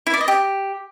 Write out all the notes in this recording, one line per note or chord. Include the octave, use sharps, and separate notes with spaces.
E4
D5
D#5
G4